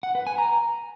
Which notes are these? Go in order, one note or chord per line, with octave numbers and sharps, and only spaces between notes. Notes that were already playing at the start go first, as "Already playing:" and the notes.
F#5
B4
G#5
A#5